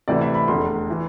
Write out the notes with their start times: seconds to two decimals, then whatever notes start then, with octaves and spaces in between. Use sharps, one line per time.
0.08 D2 C3 E3 D5
0.21 E5
0.34 B5
0.48 F1 E2 D3 C6
0.90 E3